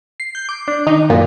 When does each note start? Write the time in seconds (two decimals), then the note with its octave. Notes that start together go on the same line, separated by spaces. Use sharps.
0.20 C7
0.35 G6
0.49 D6
0.68 D4
0.87 D#3 D#4
1.10 F#2 A#2